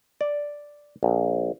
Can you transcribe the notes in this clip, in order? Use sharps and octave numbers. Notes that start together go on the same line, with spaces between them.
D5
A#1